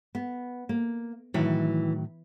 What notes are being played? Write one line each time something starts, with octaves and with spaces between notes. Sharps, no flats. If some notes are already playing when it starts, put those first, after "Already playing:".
B3
A#3
A2 D#3 E3 F#3